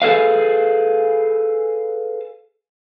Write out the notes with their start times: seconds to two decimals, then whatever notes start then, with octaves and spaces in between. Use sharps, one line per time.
0.02 G#4 A4 B4 F5